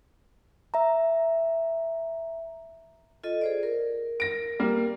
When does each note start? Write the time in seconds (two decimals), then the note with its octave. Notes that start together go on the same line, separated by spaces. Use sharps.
0.74 E5 A#5
3.24 F4 A4 D#5
3.41 G#4 C5 D5
3.63 A#4
4.20 A#6 D7
4.59 G3 A#3